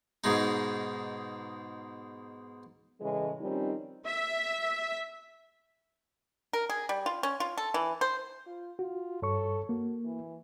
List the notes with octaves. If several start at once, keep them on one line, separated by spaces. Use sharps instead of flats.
G#2 B2 G#3 D#4
A2 C#3 E3 G#3
D#3 F3 G3 C4 C#4 D#4
E5
A#4
G#4
G3
F4
C#4
F4
A4
E3
C5
F4
F4 F#4
G2 A4 C#5 C#6
A#3 F#4
E3